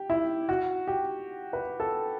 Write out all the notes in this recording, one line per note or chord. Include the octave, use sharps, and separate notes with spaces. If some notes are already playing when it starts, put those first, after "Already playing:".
Already playing: G4
E4
F#4
G4
B4
A4